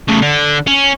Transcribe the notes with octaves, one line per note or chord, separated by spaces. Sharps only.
A2 C#3
D3
C#4